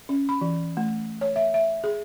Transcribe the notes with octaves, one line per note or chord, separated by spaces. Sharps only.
C#4
B5
E3
A3
C#5
E5
E5
G#4